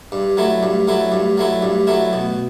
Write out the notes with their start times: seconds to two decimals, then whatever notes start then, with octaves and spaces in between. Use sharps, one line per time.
0.12 G2
0.37 F#3 A3 E4
0.63 G2
0.87 F#3 A3 E4
1.12 G2
1.37 F#3 A3 E4
1.62 G2
1.87 F#3 A3 E4
2.13 B2